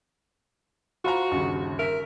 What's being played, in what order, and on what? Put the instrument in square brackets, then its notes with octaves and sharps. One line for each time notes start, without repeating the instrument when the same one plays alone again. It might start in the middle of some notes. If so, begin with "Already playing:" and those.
[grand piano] F4 C5 A#5 [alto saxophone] F#4
[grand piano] G1 D#2 C#3
[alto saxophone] A#4 [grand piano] E5 B6